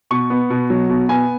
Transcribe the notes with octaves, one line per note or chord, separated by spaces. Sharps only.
B2 C#6
B3
B2
F#3
B2
B3 G#5